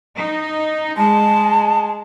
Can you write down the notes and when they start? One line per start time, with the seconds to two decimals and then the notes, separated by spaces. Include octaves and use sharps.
0.16 D#4
0.97 G#3 A5